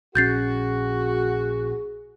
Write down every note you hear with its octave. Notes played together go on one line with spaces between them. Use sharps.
A#1 C#4 F#4 G#4 G6 A6 C7